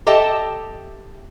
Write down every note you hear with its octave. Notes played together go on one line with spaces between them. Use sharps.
G4 A4 D#5 E5 G5 A5